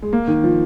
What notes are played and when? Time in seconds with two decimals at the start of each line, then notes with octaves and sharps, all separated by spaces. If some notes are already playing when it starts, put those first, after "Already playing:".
0.02 G#3
0.13 A#3
0.28 D#3
0.44 F3